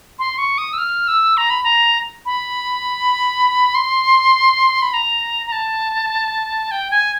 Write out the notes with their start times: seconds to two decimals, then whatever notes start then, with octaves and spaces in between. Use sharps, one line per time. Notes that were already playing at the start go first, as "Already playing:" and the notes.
0.19 C6
0.38 C#6
0.58 D#6
0.73 E6
0.78 F6
1.08 E6
1.37 A#5
1.50 B5
1.64 A#5
2.26 B5
3.75 C6
4.82 B5
4.93 A#5
5.47 A#5
5.52 A5
6.71 G5
6.91 G#5